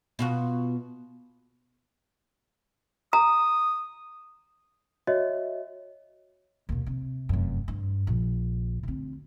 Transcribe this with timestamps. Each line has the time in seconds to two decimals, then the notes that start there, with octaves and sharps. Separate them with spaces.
0.19 B2 F4 F#4
3.13 A#5 D#6
5.07 F#4 C#5 D#5 E5
6.69 D#2 B2
6.86 C3
7.29 F1 F#2
7.68 G2
8.07 A#1
8.83 D2 C4